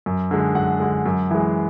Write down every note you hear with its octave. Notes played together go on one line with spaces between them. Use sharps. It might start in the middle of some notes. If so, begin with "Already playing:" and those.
F#2
D3 G#3
F#2 F#5
D3 G#3
F#2
E3 G#3